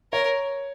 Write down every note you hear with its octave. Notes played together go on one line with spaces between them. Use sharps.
A#4 C#5